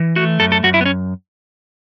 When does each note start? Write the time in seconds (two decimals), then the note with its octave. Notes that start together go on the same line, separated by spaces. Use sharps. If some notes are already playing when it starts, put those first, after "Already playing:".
Already playing: E3
0.16 A3 F#4
0.40 F#2 A4
0.52 A4
0.63 F#2 F#4
0.74 E4
0.81 B3
0.86 C#4